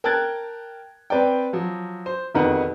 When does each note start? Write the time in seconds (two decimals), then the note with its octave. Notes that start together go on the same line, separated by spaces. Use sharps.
0.04 A#4 G5 A5 F#6 G#6 A6
1.10 C4 B4 D5 G5
1.53 F3 F#3
2.06 C5
2.35 E1 F2 D#3 B4 F#5